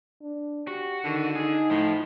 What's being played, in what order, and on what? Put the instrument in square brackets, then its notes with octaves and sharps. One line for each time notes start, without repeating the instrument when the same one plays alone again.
[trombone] D4
[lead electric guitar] F#4 [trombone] G4
[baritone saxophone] D3 [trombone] D#3
[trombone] D#4 [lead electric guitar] G#4
[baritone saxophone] A2 [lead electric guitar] F3